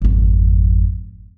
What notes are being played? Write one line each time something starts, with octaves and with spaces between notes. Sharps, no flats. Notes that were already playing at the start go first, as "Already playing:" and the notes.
G#1 F2